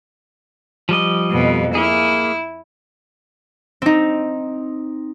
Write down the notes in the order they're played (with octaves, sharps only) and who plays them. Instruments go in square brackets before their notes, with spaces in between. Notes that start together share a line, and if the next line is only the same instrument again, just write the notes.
[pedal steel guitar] F3 G3 D#5
[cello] F2 B2
[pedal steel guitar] A#3 G#4 [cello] E4
[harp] C4 D#4